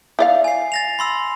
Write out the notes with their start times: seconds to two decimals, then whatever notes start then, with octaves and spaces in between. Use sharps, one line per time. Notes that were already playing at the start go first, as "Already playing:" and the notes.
0.19 E4 D5 F5
0.44 G#5 C7
0.72 A6 A#6 F7
0.99 B5 C6 E6